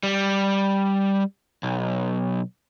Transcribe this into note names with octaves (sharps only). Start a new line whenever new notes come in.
G3
B1